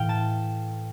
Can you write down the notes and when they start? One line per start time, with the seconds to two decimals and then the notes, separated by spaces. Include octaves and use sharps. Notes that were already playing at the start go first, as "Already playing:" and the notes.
Already playing: A2 E3 F5 G5
0.09 A5